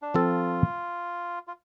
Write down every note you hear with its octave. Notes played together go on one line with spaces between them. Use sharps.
D4
F3 C4 F4 A4
F4